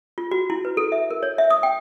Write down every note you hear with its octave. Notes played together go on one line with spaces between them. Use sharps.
F4
F#4
E4
B4
A4
E5
A#4
C#5
E5
D#6
G5